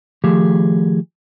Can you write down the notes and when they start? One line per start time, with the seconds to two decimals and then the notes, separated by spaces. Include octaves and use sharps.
0.24 D#3 F3 A3 G4 G#4